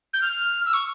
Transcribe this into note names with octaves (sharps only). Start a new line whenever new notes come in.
G6
F6
E6
C#6